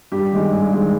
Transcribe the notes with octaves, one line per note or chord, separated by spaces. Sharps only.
G2 G4
D#3 G#3
G2 G#4
D#3 G#3